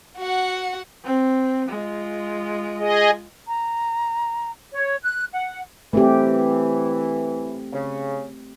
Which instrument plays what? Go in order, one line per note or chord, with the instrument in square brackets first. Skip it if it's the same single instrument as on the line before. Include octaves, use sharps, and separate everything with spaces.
[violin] F#4 F#5
[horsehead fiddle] C4
G#3 F4
[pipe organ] G#4 D#5
[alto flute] A#5
[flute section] C#5
F#6
F#5
[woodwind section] E3 [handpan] A3 C4 G4
[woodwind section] C#3